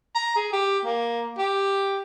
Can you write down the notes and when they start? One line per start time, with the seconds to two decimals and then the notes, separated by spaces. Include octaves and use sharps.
0.15 A#5
0.36 G#4
0.53 G4
0.85 A#3
1.38 G4